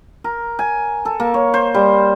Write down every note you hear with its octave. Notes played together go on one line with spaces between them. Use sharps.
A#4
G#5
A4
A#3
C#5
C5
G3